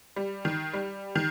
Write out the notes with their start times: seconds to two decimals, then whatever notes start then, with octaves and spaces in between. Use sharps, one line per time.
0.16 G3
0.45 D#3
0.74 G3
1.15 D#3